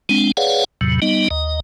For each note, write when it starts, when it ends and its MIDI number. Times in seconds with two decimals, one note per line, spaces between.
0.09 0.32 56
0.09 0.32 60
0.09 0.32 62
0.37 0.64 68
0.37 0.64 71
0.37 0.64 73
0.37 0.64 74
0.37 0.64 77
0.37 0.64 78
0.81 1.00 40
0.81 1.00 45
0.81 1.00 48
0.81 1.00 54
1.02 1.28 55
1.02 1.28 59
1.02 1.28 63
1.02 1.28 75
1.31 1.60 39
1.31 1.60 75